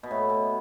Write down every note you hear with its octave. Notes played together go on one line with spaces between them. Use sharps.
B2
A2
B2